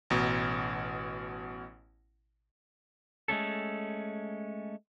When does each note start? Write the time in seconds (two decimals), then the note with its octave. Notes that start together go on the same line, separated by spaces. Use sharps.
0.10 A1 B2
3.28 G#3 A3 C#4 A4